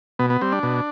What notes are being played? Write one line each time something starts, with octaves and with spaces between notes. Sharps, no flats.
B2 B3
B3
G3 C4
D4
B2